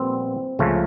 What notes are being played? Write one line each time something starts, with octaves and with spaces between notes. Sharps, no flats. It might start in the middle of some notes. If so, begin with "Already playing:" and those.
Already playing: A#1 A#2 G3 B3 C4
C#2 C#3 F3 A3